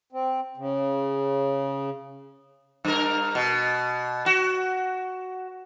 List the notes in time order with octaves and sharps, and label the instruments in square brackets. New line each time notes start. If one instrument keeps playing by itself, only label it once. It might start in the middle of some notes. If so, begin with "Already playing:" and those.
[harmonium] C4
C#3
[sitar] G2 A#4
B2
F#4